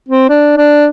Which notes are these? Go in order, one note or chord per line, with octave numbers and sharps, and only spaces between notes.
C4
D4
D4